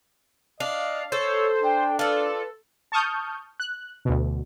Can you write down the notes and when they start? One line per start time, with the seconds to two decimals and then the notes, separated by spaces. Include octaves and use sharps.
0.60 D4 D#5 F5
1.12 A4 C5 C#5 E6
1.63 D4 G5
1.99 F4 A4 B4 D5
2.92 A5 C#6 D#6 F6 G6
3.60 F#6
4.05 D2 B2